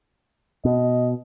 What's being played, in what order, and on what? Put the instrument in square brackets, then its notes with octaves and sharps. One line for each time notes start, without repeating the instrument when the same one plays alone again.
[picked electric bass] B2 [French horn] D#5